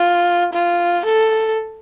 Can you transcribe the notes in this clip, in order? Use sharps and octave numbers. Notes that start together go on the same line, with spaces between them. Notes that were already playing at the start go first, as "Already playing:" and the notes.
Already playing: F4
F4
A4